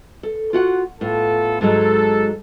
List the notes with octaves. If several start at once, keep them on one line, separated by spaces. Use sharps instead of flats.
A4
F4 F#4 F#5
A2 B3 F4 A4
G#2 F#3 G#3 A4